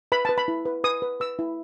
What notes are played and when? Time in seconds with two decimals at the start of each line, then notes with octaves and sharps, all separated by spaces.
0.12 B4 B5
0.25 B4 A5
0.38 B5
0.48 E4
0.65 B4
0.84 B4 D#6
1.02 B4
1.20 B4 E6
1.39 E4